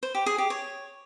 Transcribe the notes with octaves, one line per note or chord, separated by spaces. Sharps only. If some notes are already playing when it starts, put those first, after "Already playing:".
C5
G4
G#4
G4
C#5